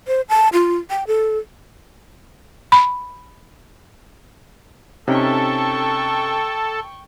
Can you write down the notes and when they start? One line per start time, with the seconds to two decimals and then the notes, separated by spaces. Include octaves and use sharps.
0.08 C5
0.29 A5
0.53 F4
0.90 G5
1.07 A4
2.72 B5
5.08 C3 C#4 D#4 A4 G5 C#6